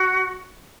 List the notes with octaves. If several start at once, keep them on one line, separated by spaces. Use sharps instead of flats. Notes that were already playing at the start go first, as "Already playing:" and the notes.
Already playing: F#4